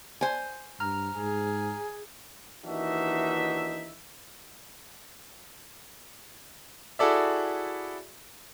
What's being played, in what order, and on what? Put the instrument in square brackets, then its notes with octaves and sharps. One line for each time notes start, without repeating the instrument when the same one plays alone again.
[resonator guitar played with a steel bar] C5 G#5
[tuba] G2 [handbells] A#5 F6
[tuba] G#2 [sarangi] G#4
[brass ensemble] D#2 E3 D4 D#4 F#4 E5
[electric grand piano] E4 F#4 G#4 A4 D5 E5